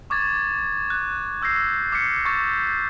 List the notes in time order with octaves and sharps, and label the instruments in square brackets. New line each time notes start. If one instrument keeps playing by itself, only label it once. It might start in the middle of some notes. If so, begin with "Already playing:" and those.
[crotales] C#6 D6 G#6 A6
F#6
C#6 E6 G6 A#6 C7
D6 F6 B6 C#7
C#6 D6 G6 A6